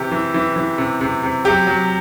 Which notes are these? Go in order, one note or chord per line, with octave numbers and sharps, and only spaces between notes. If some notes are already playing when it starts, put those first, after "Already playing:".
Already playing: C3 E3 G4
E3
E3
E3
C3
C3
C3
F#3 G4
F#3